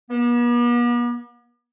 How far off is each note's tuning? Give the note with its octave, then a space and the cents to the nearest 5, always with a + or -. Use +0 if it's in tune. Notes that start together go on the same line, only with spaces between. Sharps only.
B3 -45